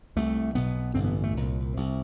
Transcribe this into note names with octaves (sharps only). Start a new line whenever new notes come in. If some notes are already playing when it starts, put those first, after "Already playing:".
C2 C3 A3
B1 B2 B3
A1 G2 D3 C4
B3
A3
C2 A#2
C2 C3